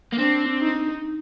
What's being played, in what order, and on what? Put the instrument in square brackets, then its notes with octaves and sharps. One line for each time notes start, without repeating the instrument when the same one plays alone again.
[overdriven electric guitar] A#3
[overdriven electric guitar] C4 [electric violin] D4
[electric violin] D#4